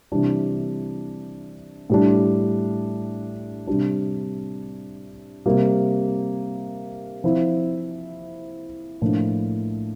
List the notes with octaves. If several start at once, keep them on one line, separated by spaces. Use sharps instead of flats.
C3 E3 G3 D4
A2 G3 D4
C3 G3 D4
C3 G3 A#3
F3 C4 E4
A2 F3 A#3 D4